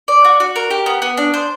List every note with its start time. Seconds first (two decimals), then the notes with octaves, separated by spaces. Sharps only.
0.08 D5
0.25 F#4
0.40 F#4
0.56 A#4
0.71 G4
0.86 B3
1.02 B3
1.17 D4
1.34 C5